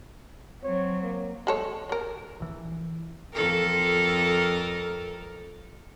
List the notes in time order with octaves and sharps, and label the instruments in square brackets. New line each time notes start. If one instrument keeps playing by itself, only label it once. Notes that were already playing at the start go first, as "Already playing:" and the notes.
[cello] F#3 C4 [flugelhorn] C#5
[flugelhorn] A#3
[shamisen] G#3 A4 C#5
F#3 A#4
[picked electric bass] A#1 E3
[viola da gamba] F2 A4 A#4